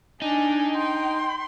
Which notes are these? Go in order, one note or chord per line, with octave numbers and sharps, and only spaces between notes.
D4 D#4 G#5
G5 C6